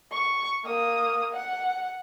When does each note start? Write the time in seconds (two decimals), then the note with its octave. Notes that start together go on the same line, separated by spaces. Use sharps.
0.13 C#6
0.65 A#3 D#6
1.34 F#5